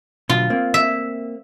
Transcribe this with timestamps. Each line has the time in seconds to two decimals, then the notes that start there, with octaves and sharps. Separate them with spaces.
0.29 B2 D3 F#3 F4
0.50 A#3 C4
0.74 E5